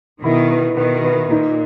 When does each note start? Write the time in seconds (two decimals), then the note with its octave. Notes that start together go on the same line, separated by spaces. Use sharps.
0.24 B2 D#3 E4
0.51 B4
0.76 B2 D#3 B4
1.04 B4
1.30 A#2 D#4